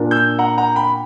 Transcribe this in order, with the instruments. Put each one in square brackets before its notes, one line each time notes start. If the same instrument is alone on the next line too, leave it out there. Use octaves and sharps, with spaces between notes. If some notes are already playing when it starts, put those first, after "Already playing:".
Already playing: [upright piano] A#2 A#3 D4
[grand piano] E6 G6
F#5 A#5
F#5 A#5
G5 B5